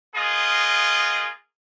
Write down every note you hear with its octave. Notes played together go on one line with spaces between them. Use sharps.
A#3 B3 F4 G#4 D#5